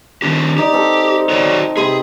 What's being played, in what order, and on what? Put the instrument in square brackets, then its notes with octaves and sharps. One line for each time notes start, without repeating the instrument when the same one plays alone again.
[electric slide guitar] D#3 D4 G4
[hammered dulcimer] D#4 D5 [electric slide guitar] G4
[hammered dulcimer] C4 A4
[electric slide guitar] F#4 C#5 D5
[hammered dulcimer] C3 C5 B5 [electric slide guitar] G#4